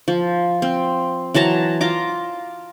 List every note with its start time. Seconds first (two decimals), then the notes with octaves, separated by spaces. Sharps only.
0.08 F3
0.62 C4
1.34 E3 F#3 A5 A#5
1.81 F4 A#5 D6